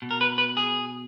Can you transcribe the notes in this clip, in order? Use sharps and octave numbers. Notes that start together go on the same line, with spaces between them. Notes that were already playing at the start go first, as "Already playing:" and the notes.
B2
A#4
B4
B4
G#4